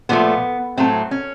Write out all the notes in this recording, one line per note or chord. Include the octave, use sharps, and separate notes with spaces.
A#2 F3 A3 B3
A2 F#3 A3 C4
C#4